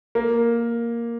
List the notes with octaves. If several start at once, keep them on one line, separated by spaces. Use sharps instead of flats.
A#3